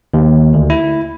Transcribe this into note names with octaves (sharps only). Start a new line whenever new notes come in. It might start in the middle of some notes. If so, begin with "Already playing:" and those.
D#2
D2
E4